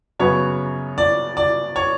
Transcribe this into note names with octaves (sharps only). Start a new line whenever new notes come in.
F#2 C#3 F#3 B3 C#5
D5
D5
C#5